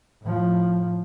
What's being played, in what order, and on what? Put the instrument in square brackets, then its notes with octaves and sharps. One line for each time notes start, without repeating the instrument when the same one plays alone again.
[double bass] A2 F3